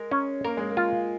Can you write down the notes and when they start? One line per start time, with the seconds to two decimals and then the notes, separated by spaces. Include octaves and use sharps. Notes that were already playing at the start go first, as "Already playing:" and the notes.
Already playing: G#3 A#4
0.11 C#4
0.45 A#3 A#4
0.57 G#3
0.70 A#3
0.77 F4